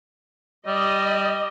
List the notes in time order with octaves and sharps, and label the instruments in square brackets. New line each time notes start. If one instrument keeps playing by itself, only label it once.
[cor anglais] G3 [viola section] D#5